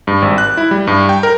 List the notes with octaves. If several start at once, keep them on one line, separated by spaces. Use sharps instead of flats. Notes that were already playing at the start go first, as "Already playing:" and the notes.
G2
G#1
F#6
E4
G3
G2
G5
A#4